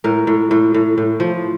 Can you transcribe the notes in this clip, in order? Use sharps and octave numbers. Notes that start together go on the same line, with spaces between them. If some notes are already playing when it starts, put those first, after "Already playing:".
A2 A#4
A2
A2
A2
A2
F3